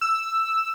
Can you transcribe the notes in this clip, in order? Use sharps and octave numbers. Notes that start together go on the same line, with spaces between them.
E6